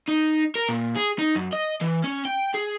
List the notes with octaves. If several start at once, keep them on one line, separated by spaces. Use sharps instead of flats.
D#4
A#4
A#2
G#4
D#4
F#2
D#5
E3
C#4
G5
G#4